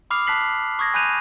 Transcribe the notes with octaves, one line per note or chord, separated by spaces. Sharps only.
B5 D6 D#6 F6 C7 F7
A5 F#6 B6 C7 F#7
C#6 D#6 G#6 A#6
G#5 B5 F#6 G6 D#7 F7